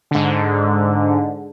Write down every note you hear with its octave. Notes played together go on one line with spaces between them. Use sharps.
G#2 D3